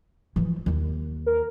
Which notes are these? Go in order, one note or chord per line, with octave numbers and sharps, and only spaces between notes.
E3 F3
D#2 D#3
A#4